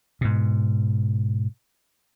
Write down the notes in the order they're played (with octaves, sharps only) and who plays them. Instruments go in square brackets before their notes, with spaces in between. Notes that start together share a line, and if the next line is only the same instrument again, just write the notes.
[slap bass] G#2 B2